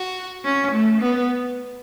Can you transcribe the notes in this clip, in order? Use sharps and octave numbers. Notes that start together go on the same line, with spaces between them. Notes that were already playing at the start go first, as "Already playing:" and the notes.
Already playing: F#4
C#4
A3
B3